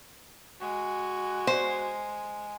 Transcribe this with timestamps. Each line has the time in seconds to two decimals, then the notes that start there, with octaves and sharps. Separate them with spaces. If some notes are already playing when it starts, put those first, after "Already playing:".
0.61 G#3 F#4
1.47 C5